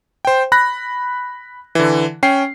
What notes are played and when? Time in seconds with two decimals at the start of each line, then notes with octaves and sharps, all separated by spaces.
0.25 C5 G5
0.52 B5 F#6 A#6
1.75 D3 E3
2.23 C#4 G5 C7